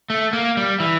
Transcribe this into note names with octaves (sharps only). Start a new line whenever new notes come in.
A3
A#3
G3
E3